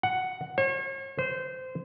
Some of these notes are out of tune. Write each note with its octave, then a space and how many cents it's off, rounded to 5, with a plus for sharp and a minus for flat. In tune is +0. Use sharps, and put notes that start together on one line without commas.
F#5 +5
C#5 -45
C5 -20